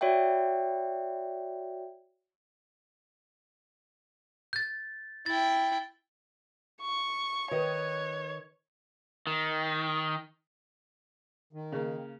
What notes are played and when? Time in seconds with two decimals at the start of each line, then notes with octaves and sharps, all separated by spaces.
0.01 F#4 C#5 D5 E5 G5
4.53 G6 A6
5.26 E4 G5 A6
6.81 C#6
7.51 D#3 B4 C#5 D#5
9.27 D#3
11.53 D#3
11.72 C#3 A#3